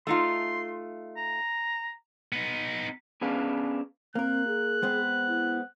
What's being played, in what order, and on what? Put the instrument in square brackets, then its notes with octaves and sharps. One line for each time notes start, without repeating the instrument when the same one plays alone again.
[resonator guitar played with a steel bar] A3 D#4 F4 [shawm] C6
[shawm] A#5
[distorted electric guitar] B3 D#4
[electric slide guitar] B3 C#4 D4 G#4 B4 F5
[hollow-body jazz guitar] A#3 A#4 [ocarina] C4 [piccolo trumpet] F#6
[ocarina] G#4
[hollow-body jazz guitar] G#3 B3 C4
[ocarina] E4